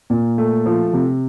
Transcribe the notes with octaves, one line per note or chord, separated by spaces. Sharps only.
A#2
A3
F3
C3